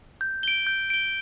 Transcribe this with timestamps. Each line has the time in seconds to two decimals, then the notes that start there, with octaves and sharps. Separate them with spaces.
0.21 G6
0.43 D7 G7
0.67 G6
0.90 D7 G7